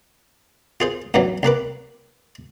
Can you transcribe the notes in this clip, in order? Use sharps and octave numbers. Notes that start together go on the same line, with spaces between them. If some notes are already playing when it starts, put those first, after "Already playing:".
F4 G#4 C5
A1 E2 G2 E3 F#3
C2 A#3 B4 D6